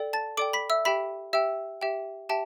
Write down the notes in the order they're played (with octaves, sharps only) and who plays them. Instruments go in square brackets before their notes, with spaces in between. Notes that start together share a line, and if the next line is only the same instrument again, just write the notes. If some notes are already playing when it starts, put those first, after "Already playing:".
Already playing: [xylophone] A4 D5 G5
A5 A6
A4 D5 G5 D6 D7
B5 B6
E5 E6
G4 E5 G5 B5 B6
G4 E5 G5 E6
G4 E5 G5
G4 E5 G5 A5